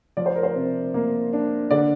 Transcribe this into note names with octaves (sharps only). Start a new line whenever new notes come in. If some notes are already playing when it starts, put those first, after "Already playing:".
F3 D5
C5
A#4
C5
C3
A#3
D4
D3 D5